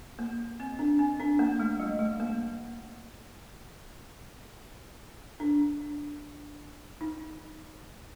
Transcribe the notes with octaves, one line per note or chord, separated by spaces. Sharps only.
A#3
C4
D4
C4
D4
A#3
A3
G3
A3
A#3
D4
D#4